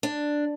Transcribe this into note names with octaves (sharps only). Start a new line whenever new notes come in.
D4